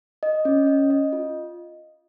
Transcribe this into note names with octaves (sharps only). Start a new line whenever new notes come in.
D#5
C#4
D#5
D#5
F4